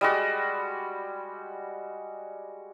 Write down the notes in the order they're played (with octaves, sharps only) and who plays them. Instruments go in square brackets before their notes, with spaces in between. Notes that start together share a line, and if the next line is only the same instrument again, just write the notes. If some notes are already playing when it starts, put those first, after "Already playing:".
[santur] G3 G#3 F#4